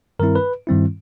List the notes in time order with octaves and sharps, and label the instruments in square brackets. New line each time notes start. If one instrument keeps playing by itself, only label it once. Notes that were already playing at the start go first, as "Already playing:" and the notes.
[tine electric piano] G2 D#3 G3 C4 E4 A#4
B4
G2 D#3 G3 C4 E4